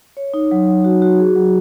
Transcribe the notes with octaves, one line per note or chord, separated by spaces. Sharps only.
C#5
D#4
F#3
F#3
F#4
F#4
G#4
F#3